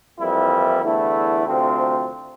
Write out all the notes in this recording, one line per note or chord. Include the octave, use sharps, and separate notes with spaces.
F2 E3 G3 A#3 E4
E2 D3 A3 E4
D2 C3 F3 C4